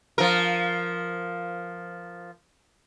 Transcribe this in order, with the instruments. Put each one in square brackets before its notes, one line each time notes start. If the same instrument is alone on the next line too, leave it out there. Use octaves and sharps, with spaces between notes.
[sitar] F3 A#4